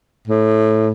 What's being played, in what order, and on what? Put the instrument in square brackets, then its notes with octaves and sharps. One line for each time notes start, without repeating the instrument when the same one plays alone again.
[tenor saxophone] A2